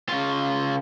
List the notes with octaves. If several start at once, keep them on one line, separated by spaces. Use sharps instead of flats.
C#3 F4